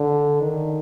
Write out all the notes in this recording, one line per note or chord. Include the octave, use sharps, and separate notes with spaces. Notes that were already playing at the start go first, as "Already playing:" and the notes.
Already playing: D3
D#3